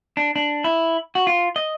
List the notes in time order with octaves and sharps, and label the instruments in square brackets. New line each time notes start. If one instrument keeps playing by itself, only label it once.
[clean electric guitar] D4
D4
E4
F#4
F4
D#5